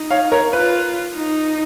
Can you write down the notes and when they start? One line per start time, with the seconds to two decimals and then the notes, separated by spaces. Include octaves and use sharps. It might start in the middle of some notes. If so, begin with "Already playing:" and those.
Already playing: D#4
0.11 C#5 F5
0.32 A#4 C#5
0.53 F4 B4
1.16 D#4